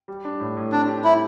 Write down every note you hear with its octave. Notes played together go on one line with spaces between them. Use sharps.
G3
D4
A2
A2
C4 D4
G4
G3 E4